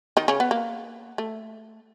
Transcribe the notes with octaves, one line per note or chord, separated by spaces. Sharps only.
D#3 D#4
C#3 C#4
B3
A#3
A3